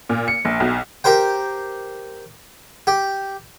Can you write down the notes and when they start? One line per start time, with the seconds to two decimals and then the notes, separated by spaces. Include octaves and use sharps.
0.09 A#2
0.28 C#7
0.45 A#1
0.60 B1
1.04 G4 A#4 C5 G5
2.87 G4